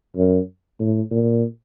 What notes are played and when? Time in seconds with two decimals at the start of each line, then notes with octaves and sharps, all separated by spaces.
0.17 F#2
0.79 A2
1.11 A#2